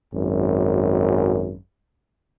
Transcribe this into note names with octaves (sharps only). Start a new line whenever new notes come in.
G#1 F#2